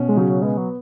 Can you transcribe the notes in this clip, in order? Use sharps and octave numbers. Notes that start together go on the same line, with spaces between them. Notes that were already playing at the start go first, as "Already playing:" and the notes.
Already playing: B2 C#4
G#3
C#3 F#3
G#3 B3
F#3